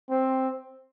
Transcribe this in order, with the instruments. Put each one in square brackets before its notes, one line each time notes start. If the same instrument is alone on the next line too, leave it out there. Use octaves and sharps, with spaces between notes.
[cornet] C4